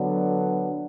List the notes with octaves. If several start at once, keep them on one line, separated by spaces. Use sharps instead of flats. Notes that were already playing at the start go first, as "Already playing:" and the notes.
Already playing: D3 F#3 B3 D4